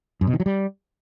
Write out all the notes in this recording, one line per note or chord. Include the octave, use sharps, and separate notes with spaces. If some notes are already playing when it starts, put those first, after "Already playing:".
F#2
B2
D#3
F#3
G3